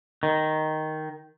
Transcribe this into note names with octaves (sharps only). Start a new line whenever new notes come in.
D#3